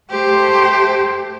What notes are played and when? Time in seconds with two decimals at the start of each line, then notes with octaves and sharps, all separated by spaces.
0.11 A3 G4 C5